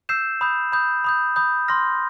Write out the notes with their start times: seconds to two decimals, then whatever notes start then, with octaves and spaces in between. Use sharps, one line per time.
0.09 E6 G6 C7 E7
0.41 B5 D#6 G6
0.72 B5 D#6 G6
1.04 B5 D#6 G6
1.36 B5 D#6 G6
1.68 C6 F6 A#6